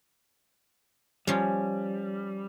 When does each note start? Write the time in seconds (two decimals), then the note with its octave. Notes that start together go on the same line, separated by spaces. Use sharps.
1.27 F3 G3 C#4